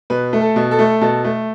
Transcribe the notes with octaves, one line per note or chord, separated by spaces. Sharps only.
B2 B4
A3
A4
B2
A4
A3
B2 A4
A3